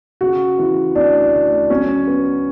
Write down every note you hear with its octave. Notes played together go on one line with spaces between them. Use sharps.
C#3 F#4
E3
D2 D4
D2
F#3 C#4
B3